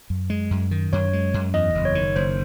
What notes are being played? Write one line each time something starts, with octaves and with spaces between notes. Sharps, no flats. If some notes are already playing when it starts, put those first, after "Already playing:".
F#2
G#3
F#2
D#3
F#2 C#5
G#3
F#2
E2 D#5
F#1
C#5
D#3
F#1 C5